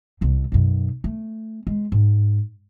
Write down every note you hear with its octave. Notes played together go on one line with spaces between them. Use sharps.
C2 C3
B1 F#2
A3
G#3
G#2